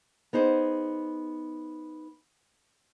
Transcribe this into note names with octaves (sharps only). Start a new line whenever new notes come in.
B3 D#4 G#4 C5